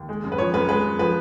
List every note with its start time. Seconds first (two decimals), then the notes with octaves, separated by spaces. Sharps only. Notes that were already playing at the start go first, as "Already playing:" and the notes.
Already playing: D#2
0.09 G#3
0.24 F#2
0.32 B4
0.38 F3 C#5
0.54 F#2 B4
0.69 G#3 B4
0.84 F#2
0.99 F3 B4